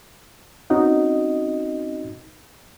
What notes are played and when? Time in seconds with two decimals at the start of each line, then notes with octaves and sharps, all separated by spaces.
0.70 C4 C#4 D#4 F#4 D#5